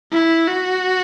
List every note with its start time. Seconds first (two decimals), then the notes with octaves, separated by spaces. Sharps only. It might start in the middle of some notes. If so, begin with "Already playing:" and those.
0.12 E4
0.48 F#4